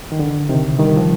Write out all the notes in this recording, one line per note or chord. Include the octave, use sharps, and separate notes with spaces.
D#3
D3
C3 D#3
D#3 G3
F3